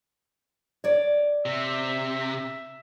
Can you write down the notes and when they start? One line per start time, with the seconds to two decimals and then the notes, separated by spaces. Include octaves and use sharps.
0.84 C#5 D5
1.46 C3 E5